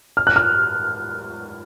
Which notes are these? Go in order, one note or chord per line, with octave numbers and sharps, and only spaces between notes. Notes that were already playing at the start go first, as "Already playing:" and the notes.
F6
F#6
F6